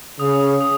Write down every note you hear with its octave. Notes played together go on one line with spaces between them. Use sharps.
C#3 D#6
D#6
D#6
D#6